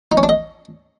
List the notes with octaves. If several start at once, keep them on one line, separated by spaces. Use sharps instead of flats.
D#4
C#4
D4
D#5